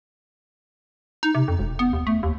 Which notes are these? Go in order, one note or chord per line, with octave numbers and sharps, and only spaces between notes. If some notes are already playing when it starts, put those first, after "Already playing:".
D#4
C3
F2
E1
B3
D#2
A3
D#2